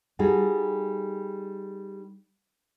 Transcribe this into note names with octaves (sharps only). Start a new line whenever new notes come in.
G3 D#4 F#4 G#4 A4